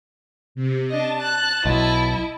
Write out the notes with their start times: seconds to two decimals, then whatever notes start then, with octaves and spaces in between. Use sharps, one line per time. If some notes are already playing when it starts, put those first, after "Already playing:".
0.55 C3
0.90 D4 D#5 A5
1.20 F#6
1.65 B1 E4 D#5